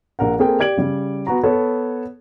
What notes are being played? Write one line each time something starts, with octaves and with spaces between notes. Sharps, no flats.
A#1 A#4 F#5
A#3 C4 G#4 A4 G5
G4 D5 G#6 D7 F#7
C#3 G3
B3 F#4 A#5
B3 A4 C#5